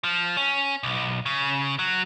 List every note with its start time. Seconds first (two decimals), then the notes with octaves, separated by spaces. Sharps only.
0.04 F3
0.37 C#4
0.83 B1
1.26 C#3
1.79 F#3